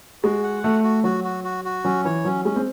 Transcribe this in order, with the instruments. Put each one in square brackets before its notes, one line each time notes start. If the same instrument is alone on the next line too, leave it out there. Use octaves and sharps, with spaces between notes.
[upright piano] G#3 [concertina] F#4
[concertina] F#5
[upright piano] A3 [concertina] F#4
[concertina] F#4
[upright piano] F#3 [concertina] F#4
[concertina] F#4
F#4
F#4
[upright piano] F#3 [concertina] C#4
[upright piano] E3 [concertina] C#5
[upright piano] F#3 [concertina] C#4
[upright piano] G#3 [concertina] C#4
[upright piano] C4